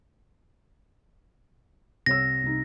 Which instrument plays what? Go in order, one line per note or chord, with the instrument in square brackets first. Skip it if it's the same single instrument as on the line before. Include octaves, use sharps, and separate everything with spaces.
[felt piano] C2 C#5 E6 [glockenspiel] A#6
[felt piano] C2 D#4